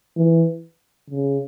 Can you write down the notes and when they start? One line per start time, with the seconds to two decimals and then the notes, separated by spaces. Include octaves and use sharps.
0.17 E3
1.10 C#3